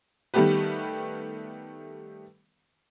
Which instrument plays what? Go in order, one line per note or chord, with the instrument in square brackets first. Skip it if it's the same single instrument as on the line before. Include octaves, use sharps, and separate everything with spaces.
[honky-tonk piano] D#3 G3 A3 B3 G4 B4